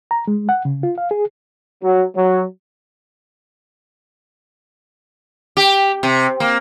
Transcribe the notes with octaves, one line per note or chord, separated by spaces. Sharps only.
A#5
G#3
F#5
C#3
F4
F5
G#4
F#3
F#3
G4
C3
A#3